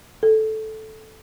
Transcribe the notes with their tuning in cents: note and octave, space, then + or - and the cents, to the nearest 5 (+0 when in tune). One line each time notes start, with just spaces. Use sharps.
A4 -10